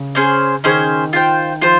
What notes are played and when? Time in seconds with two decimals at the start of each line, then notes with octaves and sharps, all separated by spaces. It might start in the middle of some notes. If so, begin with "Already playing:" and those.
Already playing: C#3
0.15 C#4 G#4 C5
0.64 D#3 C#4 G#4 C5
1.13 F4 C5 G5
1.62 F3 F4 C5